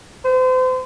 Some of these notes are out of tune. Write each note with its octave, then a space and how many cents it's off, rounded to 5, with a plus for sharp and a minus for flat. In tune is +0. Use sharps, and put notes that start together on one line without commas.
C5 -35